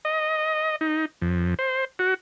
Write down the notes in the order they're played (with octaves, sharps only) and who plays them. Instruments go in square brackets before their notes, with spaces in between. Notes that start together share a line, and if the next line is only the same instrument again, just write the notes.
[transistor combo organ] D#5
D#4
F2
C5
F#4